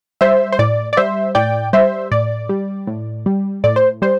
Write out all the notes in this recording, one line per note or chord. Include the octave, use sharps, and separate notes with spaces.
G3 C5 E5
C5
A2 D5
D5
G3 C5 E5
A2 D5 G5
G3 C5 E5
A2 D5
G3
A2
G3
A2 D5
C5
G3 C5